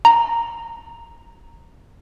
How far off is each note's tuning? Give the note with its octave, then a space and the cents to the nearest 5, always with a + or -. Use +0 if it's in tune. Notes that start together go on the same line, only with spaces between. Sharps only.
A#5 -5